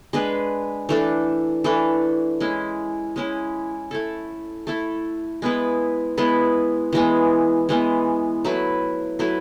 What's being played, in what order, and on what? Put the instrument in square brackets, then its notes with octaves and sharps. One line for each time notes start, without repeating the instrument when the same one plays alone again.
[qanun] G#3 D4 G#4 B4
E3 A3 D4 A4
E3 A3 D4 A4
G#3 C#4 E4
G#3 C#4 E4
A3 E4 A4
A3 E4 A4
G#3 B3 E4 B4
G#3 B3 E4 B4
E3 G#3 B3
E3 G#3 B3
F#3 A3 E4 B4
F#3 A3 E4 B4